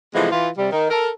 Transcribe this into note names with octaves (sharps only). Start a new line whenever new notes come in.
C3 E3 F3 G#3 A3 B3
E3 F4
C3 G3
D#3
A4 A#4